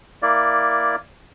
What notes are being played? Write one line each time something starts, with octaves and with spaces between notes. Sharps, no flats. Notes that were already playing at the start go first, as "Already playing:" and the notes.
A#3 E4 D5